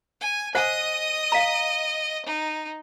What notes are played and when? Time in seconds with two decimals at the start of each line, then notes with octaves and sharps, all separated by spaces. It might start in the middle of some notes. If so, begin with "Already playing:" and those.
0.21 G#5
0.55 C5 D#5 F#5 G#5 D#6
1.32 F5 A#5
2.26 D#4